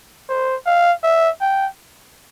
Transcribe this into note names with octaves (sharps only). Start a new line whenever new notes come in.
C5
F5
E5
G5